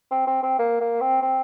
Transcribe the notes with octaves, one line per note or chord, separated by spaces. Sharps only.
C4
C4
C4
A#3
A#3
C4
C4